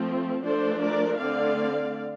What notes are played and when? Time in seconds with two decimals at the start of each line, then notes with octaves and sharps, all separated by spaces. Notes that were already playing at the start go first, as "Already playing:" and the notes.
Already playing: F3 A3 C4
0.44 F3 A3 D4 A4 C5
0.81 A#4 D5
1.19 D3 A3 C4 D5 F5